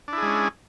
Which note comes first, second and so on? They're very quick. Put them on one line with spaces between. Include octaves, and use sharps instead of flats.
D4 E4 G#4 G#3 C#4